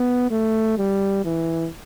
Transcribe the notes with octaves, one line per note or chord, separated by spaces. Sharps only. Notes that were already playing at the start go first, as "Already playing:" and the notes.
Already playing: B3
A3
G3
E3